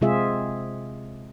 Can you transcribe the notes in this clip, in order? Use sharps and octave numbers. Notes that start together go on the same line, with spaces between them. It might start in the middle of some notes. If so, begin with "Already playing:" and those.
C3 G#3 C4 F4 G#4 E5